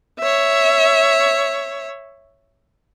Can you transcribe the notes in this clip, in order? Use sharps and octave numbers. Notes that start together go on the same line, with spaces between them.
C#5 E5